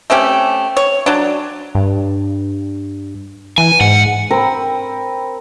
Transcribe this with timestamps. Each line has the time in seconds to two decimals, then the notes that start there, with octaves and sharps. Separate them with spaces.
0.10 A3 C4 C#4 G4
0.77 C#5
1.06 F#3 D4
1.75 G2
3.58 E3 G#5
3.81 G#2 F#5
4.31 C4 A#4 B5